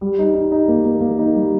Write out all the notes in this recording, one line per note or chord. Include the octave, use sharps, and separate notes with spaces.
G3
D#4
D#4
D#4
A#3
A#3
A#3
D#4
G3